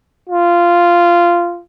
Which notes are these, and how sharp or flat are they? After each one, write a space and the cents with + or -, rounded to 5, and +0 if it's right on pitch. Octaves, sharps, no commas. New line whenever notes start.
F4 -10